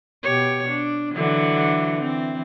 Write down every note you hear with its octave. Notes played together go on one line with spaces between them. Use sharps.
B2 G4 C#5
D4
D3 E3 F#3
E3 C4